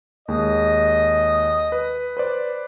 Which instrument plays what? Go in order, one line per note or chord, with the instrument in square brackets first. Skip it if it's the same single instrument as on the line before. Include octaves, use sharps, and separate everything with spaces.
[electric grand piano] D#2 G#3 [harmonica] D#5
[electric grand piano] B4
B4 C5 D5